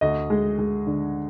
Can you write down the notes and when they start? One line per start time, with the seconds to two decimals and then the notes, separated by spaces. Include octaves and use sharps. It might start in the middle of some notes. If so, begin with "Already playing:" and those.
0.01 D2 D#5
0.30 G#3
0.59 G#3
0.87 D3